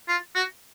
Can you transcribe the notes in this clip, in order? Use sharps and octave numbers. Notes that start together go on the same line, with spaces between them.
F4
F#4